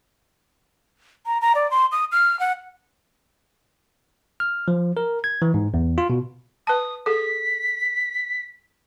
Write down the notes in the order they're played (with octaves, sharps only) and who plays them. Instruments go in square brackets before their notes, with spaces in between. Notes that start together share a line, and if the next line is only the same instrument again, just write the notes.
[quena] A#5
A#5
D5
C6
D#6
F6
F#5
[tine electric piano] F6
F3
A#4
G#6
E3
G#2
E2
F4
B2
[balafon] B4 A5 [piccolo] D#6
[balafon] G#4 A4 [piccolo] B6